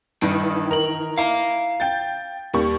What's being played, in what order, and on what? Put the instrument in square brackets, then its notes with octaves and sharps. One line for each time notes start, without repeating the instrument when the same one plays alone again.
[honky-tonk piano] G2 [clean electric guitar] D#3 E3
[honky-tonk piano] A#4 F#7
[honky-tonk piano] E4 [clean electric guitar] F5 A#5
[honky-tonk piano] G5 G6 A6
D#2 G3 C#6